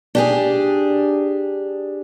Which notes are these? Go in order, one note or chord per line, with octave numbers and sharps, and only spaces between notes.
D4 G4 G#4